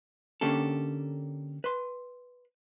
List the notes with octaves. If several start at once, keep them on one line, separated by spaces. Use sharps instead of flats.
D3 A#3 C#4 G4 A4
B4 C6